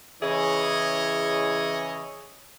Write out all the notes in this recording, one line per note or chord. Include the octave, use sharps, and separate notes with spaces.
C#3 E3 E4 G#4 C#5 D#5